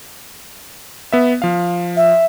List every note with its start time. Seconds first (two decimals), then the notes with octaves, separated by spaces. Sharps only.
1.13 B3 E5
1.42 F3 F5
1.97 E5